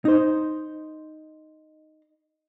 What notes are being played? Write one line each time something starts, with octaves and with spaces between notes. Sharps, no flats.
D#4 C5